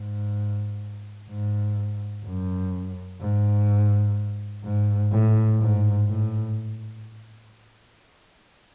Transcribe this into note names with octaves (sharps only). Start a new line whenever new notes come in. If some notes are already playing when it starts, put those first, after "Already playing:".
Already playing: G#2
G#2
F#2
G#2
G#2
A2
G#2
A2